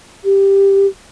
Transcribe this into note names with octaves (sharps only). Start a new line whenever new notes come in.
G4